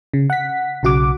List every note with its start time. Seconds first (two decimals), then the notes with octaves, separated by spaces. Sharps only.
0.14 C#3
0.30 F#5 B6
0.83 B1 C#3 F#4 F#5 D6